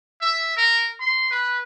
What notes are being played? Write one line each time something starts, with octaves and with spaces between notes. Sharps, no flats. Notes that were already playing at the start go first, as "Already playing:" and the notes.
E5
A#4
C6
B4